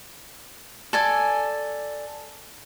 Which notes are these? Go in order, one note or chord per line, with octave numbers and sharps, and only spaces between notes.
A4 D5 G#5